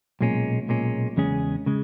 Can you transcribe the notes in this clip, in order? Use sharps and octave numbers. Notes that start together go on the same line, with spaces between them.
B1 A#2 G#3 C#4
B1 A#2 G#3 C#4
E2 C#3 G#3 C#4 G#4
C#3 G#3